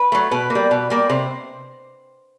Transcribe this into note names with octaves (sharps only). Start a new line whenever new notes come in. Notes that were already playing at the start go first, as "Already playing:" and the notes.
Already playing: B4
F#3 A3
B2 B4
A#3
G3
B2
G3 A#3
C3 C5